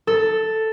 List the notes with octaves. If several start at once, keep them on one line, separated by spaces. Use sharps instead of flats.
A4